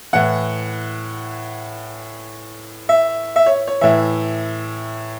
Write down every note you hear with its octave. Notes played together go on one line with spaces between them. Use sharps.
A2 E3 F#5
E5
E5
C#5
C#5
A2 E3 E5